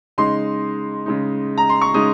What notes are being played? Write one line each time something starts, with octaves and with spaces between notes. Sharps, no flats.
C#3 G#3 D#4 C6
C#3 G#3 D#4
A#5
C6
C#6
C#3 G#3 D#4 D#6